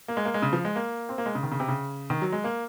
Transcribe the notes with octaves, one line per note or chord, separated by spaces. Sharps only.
A#3
G#3
A#3
G#3
C#3
F3
G#3
A#3
C4
A#3
G#3
C#3
D#3
C#3
C3
C#3
D#3
F#3
G#3
A#3